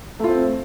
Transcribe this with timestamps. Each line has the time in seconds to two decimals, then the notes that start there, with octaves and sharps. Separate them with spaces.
0.20 A3
0.24 F4
0.28 C4